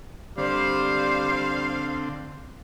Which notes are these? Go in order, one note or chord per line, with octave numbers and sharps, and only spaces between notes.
D3 G3 C4 C5 F5